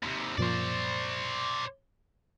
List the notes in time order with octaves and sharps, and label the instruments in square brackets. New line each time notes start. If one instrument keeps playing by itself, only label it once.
[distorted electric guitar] D#2 C3
[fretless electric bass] F#2 A#2 F3 [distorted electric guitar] C5 D5